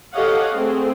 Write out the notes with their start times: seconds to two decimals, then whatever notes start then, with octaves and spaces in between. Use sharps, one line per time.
0.13 G4 A4 C#5 D#5 F5 F#5
0.55 A3 C4 G#4